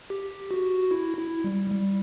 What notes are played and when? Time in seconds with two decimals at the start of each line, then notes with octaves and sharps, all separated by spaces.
0.10 G4
0.51 F#4
0.91 E4
1.18 E4
1.44 G3
1.72 G3